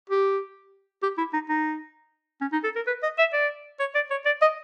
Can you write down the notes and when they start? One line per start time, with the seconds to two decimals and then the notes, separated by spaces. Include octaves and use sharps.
0.10 G4
1.03 G4
1.18 E4
1.33 D#4
1.49 D#4
2.41 C#4
2.52 D#4
2.64 A4
2.76 A#4
2.87 B4
3.03 D#5
3.18 E5
3.33 D5
3.80 C#5
3.95 D5
4.11 C#5
4.26 D5
4.42 D#5